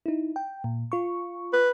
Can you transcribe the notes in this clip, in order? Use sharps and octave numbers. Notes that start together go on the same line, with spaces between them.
D#4 E4
G5
A#2
F4 C#6
B4